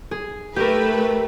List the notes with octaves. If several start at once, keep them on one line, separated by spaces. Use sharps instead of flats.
G#4
A3 G4 A#4 B4